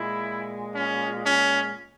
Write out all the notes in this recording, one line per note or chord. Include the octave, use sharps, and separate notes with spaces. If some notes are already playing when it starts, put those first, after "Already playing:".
Already playing: A#2 G#3 E4
C#4
C#4